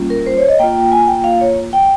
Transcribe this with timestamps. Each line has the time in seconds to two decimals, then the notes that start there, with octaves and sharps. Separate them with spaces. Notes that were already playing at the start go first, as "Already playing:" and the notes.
Already playing: G3 A#3 C#4 F4
0.10 A#4
0.26 C5
0.38 C#5
0.49 D#5
0.59 A#3 F4 G5
0.92 G#5
1.08 G5
1.24 F5
1.41 C#5
1.73 G5